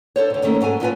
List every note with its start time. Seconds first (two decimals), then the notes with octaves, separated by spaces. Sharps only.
0.16 D4 A4 C5 C#5
0.30 D2 A#2
0.42 F#2 D#3 A3 A#3 C4 C#4
0.61 G#2 F#3 A4 G#5
0.80 G#2 F3 C#4 F4 B4 G#5